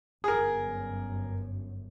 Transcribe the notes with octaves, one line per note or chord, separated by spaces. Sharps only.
G1 F#2 G#4 A#4